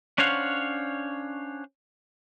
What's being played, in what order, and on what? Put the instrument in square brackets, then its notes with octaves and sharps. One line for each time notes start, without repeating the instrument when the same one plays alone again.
[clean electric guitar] C#4 D4 C5 C#5 F5 F#5